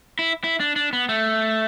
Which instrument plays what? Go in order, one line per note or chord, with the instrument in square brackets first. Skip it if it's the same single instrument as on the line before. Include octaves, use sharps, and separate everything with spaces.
[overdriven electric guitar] E4
E4
D4
D4
B3
A3